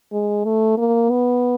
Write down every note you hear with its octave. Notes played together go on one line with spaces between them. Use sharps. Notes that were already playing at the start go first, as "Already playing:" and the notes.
G#3
A3
A#3
B3